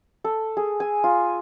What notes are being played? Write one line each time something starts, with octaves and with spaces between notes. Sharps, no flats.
A4
G#4
G#5
F4